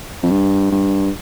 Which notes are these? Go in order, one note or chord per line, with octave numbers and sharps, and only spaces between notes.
F2
G2
G2